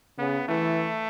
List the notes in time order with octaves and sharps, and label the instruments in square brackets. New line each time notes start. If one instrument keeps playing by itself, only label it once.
[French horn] C#3 [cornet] B3
[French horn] E3 [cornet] A3